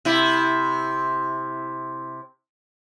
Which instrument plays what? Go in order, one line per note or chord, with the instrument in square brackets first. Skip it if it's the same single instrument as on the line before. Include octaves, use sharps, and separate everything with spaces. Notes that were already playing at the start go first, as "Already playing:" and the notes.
[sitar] C3 E4